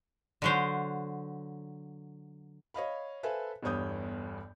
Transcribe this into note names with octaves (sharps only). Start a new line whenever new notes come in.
D3 F#3 C5
C#5 D#5 F5 B5
A4 B4 C5 E5 F5 G#5
G1 E2 G2 C#5 D#6 G6